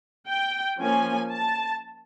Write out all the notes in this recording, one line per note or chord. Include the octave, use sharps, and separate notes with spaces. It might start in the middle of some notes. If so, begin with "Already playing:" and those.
G5
F3 A#3 C#4 G#5
A5